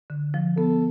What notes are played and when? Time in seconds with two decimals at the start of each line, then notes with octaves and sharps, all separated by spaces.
0.10 D3
0.34 F3
0.57 B3 A4